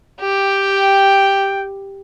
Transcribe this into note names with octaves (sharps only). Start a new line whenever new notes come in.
G4 G5